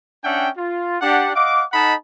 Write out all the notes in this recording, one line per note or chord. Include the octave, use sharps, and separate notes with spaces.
C#4 D4 E5 F#5 G5
F4
D4 G4 F#5
D#5 F5 F#5 D6
D#4 A4 D#5 F#5 A5 B5